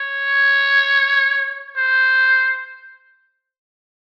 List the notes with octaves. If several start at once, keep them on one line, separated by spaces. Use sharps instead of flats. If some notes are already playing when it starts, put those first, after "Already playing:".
Already playing: C#5
C5